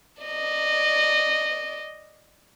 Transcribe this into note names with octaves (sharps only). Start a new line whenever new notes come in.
D5 D#5